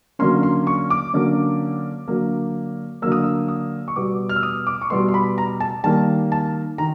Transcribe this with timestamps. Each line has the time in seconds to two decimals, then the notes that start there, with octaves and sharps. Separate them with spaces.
0.19 D3 F#3 A#3 C#4 C6
0.43 C6
0.67 C#6
0.90 D6
1.13 D3 F#3 A#3 C#4
2.08 D3 F#3 A#3
3.02 D3 F#3 A#3 E6
3.12 D#6
3.23 E6
3.48 D#6
3.88 C#6
3.96 B2 G3 B3 D6
4.29 F6
4.36 E6
4.43 D#6
4.67 D6
4.81 C#6
4.90 B2 G3 B3 C6
5.09 C6
5.14 B5
5.38 A#5
5.60 A5
5.84 D#3 G3 A#3 A5
6.32 A5
6.78 D#3 A#5